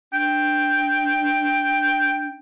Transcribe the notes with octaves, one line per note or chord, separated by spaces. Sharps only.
D4 G5